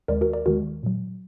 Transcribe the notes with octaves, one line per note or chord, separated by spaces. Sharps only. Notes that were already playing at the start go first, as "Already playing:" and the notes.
D#2 D#3 G#3 A#4 D5
F#4 A#4
A#4 D5
D#2 D#3 G#3 F#4 A#4
A#2 F#3